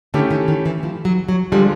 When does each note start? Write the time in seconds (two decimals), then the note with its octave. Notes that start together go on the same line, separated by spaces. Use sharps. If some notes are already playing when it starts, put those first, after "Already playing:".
0.14 D3 A3 C#4 E4 G4
0.31 D#3
0.48 D#3
0.66 E3
0.83 F3
1.05 F#3
1.29 F#3
1.52 D3 F3 G3 G#3